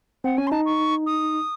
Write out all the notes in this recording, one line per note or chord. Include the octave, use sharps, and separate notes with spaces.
C4 F#5
C#4 G#5
C6
D#4 A5
C#6
D#6